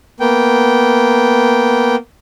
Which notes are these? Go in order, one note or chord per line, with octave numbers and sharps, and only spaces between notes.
A#3 B3 G5